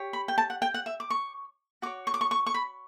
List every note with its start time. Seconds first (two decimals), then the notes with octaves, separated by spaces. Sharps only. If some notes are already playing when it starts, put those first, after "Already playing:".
Already playing: G4 C#5
0.13 B5
0.28 G5
0.38 A5
0.50 F#5
0.62 G5
0.74 F#5
0.86 E5
1.00 D6
1.10 C#6
1.82 F#4 D6
1.86 C#5
2.07 C#6
2.14 D6
2.21 C#6
2.31 C#6
2.46 C#6
2.54 B5